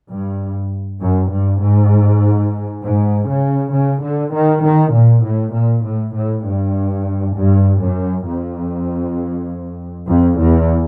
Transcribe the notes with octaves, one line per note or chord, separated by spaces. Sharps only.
G2
F#2
G2
G#2
G#2
C#3
C#3
D3
D#3
D#3
A#2
A2
A#2
A2
A2
G2
G2
F#2
F2
F2
E2